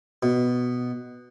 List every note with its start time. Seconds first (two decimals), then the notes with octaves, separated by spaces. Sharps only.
0.23 B2